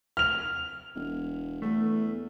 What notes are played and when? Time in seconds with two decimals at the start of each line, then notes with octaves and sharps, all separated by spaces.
0.17 F6 F7
0.95 E1
1.62 E2 A3